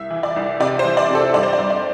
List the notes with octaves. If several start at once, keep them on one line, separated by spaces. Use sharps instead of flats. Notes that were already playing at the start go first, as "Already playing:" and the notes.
Already playing: C2 E5
E3
D5
C2
C3 D5
C5
E3
D5
C3
A4
G2 D5
C5
D5
G2
D5